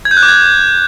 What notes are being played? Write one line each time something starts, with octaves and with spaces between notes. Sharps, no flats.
G#6
G6
F#6
D6
G#6